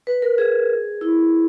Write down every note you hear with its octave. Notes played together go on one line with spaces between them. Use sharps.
B4
A#4
G#4
E4